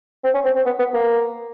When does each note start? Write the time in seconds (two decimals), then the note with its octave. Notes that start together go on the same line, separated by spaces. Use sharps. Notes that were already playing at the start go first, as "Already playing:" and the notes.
0.24 C4
0.34 C#4
0.44 C4
0.55 C4
0.66 B3
0.79 B3
0.94 A#3